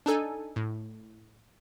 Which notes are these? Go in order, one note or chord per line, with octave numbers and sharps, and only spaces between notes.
D4 D#4 A4 G#5
A2